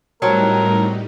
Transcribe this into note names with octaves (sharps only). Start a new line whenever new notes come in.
A2 F#3 G3 C4 D#4 A4 A#4